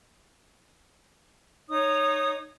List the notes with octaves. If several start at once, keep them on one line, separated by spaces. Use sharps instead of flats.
D#4 C#5 D#6